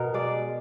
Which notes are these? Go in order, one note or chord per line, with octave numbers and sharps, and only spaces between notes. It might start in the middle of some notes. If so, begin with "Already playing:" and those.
Already playing: B2 A#4
G#3 D5